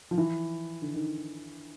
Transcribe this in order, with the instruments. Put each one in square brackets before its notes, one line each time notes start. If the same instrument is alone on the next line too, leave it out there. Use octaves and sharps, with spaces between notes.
[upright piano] F3
E3
D3
D#3